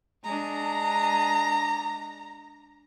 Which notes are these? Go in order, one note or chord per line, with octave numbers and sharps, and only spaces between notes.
G#3 D4 A#5